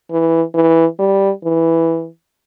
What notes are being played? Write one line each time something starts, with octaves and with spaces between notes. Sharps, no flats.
E3
E3
G3
E3